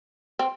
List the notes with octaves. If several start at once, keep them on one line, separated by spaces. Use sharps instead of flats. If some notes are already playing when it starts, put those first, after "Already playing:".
C4